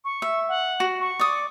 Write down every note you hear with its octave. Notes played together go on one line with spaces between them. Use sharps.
C#6
E5
F#5
F#4
C#6
D5 D#6